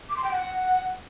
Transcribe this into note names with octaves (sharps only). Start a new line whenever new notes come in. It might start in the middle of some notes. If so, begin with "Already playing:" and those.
D6
C6
G5
F#5